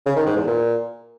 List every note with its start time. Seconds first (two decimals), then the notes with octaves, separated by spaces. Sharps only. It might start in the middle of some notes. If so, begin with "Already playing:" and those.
0.06 C#3
0.16 D#3
0.27 G#2
0.37 E2
0.47 A#2